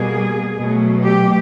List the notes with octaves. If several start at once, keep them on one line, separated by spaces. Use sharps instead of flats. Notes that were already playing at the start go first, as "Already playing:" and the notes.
Already playing: B2 G3 A#3 G#4
B2 F#3 A3
G4